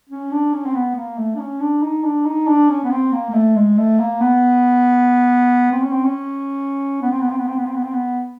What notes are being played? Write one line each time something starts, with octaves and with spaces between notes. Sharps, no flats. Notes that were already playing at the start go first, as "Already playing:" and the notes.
C#4
D4
C#4
C4
B3
A#3
A3
D4
C#4
D4
D#4
D4
D#4
D4
C#4
B3
C4
A#3
A#3
A3
G#3
A3
A#3
B3
C4
C#4
C4
C#4
B3
C4
B3
C4
B3
C4
B3
C4
B3
C4
B3